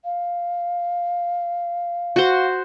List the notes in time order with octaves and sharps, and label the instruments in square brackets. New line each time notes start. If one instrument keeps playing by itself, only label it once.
[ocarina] F5
[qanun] F#4 C5